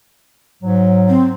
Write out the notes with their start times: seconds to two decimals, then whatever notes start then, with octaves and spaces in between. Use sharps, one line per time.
0.63 G#2 F#3
1.09 C4